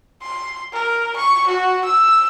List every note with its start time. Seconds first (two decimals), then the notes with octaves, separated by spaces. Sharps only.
0.23 C6
0.73 A#4
1.17 C#6
1.47 F#4
1.85 E6